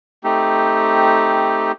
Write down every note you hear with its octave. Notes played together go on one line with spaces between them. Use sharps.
A3 C4 D#4 G4